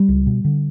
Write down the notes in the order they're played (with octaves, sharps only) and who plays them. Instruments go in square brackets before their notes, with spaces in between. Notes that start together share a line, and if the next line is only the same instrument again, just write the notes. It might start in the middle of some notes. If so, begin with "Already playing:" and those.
Already playing: [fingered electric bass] G3
C#2
B2
D3